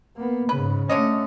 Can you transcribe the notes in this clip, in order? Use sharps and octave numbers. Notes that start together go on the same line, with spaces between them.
A#3 B3
G#2 C#3 B4
D3 A3 C#4 C#5 D#5